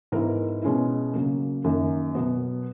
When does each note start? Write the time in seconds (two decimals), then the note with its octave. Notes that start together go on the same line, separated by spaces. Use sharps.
0.12 G#2 E3 B3 E4 A#4
0.63 B2 G#3 C#4 E4
1.14 C#3 F#3 A#3
1.64 F#2 D#3 A#3
2.15 B2 F#3 B3